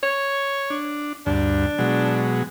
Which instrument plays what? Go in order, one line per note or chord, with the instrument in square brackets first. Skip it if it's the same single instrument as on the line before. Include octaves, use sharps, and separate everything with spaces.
[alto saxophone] C#5
[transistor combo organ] D4
[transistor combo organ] D2 G2 [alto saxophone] D4
[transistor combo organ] B2 F#3 G#3